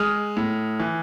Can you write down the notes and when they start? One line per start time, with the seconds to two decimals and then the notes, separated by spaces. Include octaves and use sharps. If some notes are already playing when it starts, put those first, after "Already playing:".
Already playing: G#3 D#6 F6
0.37 A2
0.79 E3